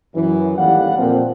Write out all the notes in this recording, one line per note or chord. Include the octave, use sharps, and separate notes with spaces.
F#2 E3
A1 D#2 G3 F5 F#5
F2 A#2 F3 A#3 C4